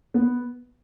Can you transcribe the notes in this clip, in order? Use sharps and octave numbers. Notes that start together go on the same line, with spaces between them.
B3